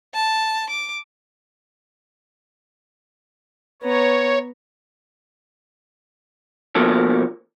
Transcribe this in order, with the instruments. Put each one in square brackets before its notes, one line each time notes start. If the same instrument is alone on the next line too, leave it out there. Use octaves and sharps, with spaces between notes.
[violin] A5
D6
[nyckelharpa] B3 A#5 [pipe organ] C#5
[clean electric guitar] B2 F3 A#3 A4